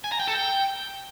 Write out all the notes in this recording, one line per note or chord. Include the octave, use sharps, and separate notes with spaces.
G#5
A#5
G5
A4
G5